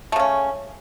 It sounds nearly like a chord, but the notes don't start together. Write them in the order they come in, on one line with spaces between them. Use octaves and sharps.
A3 C#3 C#4